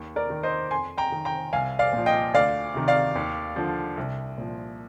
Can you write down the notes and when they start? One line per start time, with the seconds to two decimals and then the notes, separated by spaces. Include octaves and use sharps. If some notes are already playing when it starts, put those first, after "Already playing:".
Already playing: D#2
0.16 A#4 D5
0.30 D#3
0.43 C5 D#5
0.71 F2 G#5 C6
0.98 G5 A#5
1.12 D#3
1.25 G5 A#5
1.53 C2 F5 G#5
1.79 D5 F5
1.93 A#2 F3
2.06 D#5 G5
2.34 D2 D5 F5
2.74 C3 D#3
2.88 D5 F5
3.16 D#2
3.56 D3 F3
3.97 C2
4.38 A#2 F3